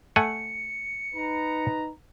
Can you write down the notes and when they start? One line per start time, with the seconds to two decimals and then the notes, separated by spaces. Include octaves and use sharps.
0.16 A3 F#5 G#5 C#7
1.14 D#4 B4 A#5